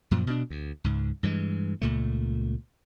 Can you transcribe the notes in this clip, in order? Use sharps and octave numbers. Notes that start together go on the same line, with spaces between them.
F#2 A#2 F3
B2 D4
D2
C#2 G#2
G2 E3 F3 G#3
C#2 A#2 A3